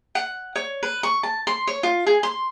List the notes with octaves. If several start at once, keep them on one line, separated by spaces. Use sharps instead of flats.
F#5
C#5
B4
C#6
A5
C6
C#5
F4
G#4
C6